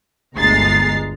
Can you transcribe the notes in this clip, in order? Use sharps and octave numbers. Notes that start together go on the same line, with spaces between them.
G1 D2 G#3 A#5 A6 C7